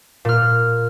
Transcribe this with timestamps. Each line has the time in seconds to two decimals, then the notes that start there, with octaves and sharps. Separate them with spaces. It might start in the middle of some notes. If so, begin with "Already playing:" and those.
0.25 A#2 F6